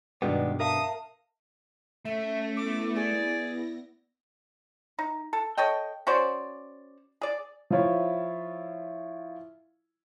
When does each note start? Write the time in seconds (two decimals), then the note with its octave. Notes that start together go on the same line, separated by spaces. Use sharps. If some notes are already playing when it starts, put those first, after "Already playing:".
0.22 G2 B2 D#3 G#3 B3 G4 D5
0.60 A#4 E5 F5 A5 D#6
2.05 A3 C#4 E5 A#6
2.57 B3 E4 D6 A#6
2.95 G#4 D5
4.99 D#4
5.33 A4
5.57 A4 C#5 D#5 G5
6.07 C#4 F#4 C5 D5
7.21 G#4 D5
7.70 F3 E4 F4 C#5 E5